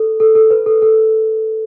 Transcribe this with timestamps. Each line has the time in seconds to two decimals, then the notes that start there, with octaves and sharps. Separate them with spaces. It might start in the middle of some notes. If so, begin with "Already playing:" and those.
Already playing: A4
0.20 A4
0.35 A4
0.51 B4
0.66 A4
0.82 A4